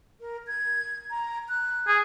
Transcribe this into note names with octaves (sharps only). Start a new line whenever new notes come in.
A#4
G#6
A#5
F#6
G#4 G#5